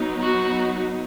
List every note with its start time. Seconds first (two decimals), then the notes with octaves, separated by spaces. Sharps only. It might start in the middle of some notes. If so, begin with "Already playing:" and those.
Already playing: F#3 B3 D#4
0.21 F#4